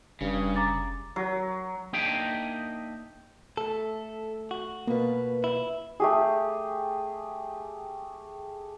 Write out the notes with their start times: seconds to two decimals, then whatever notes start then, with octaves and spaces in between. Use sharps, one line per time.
0.21 F1 G2 C#3
0.56 A#5 D6 A6
1.16 F#3
1.93 A#3 D4 D#4 D#5 E5 G5
3.57 A3 A4
4.51 F#4
4.87 B2 A#3 F4 B4
5.44 E4
6.00 A3 G4 G#4